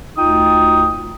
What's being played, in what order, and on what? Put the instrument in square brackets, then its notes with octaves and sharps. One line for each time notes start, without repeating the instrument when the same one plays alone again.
[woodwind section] D2 D#4 F4 G5 D#6